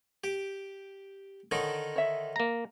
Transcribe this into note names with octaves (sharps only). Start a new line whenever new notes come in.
G4
D3 D#3 D#4 C#5
C#5 E5
A#3 A#5